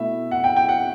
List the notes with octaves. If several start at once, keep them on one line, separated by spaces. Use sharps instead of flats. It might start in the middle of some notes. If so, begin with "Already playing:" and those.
Already playing: B2 A3 E4 E5
F#5
G5
G5
F#5